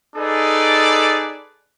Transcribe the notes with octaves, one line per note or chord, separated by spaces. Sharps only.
D#4 G#4 A4 B4 D5